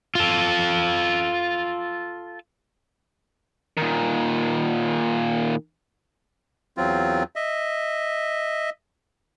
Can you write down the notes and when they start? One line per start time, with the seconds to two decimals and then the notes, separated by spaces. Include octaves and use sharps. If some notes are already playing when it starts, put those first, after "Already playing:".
0.15 F4 A4
3.77 A#2 D#3
6.77 E2 F#3 C4 F4
7.36 D#5 E5